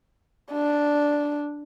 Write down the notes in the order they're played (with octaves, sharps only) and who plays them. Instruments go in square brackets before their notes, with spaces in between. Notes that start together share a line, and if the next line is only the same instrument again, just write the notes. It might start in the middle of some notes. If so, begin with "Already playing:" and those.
[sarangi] D4